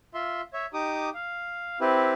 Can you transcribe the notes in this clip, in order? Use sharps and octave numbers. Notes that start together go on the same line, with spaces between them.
F4 E5 C6
C#5 E5
D#4 G4 D6 D#6
F5
C4 E4 G4 B4